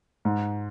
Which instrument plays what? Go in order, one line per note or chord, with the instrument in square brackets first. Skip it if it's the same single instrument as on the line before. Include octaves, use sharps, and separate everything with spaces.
[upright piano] G#2